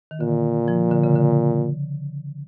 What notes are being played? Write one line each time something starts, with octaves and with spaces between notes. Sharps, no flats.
D#3
A#2 D3
F3
D3
C#3
D3